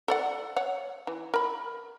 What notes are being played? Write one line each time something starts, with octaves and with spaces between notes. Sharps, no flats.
A4 D5 F#5
C#5 F#5
E3
A#4 B5